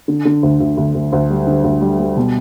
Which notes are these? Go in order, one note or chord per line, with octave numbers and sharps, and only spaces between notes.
D3
D3
D2
D2
D2
D2
D2
G3
D3
D2
G3
G3
B2